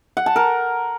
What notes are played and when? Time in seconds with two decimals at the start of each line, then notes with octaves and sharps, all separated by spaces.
0.17 F#5
0.26 A5
0.36 A#4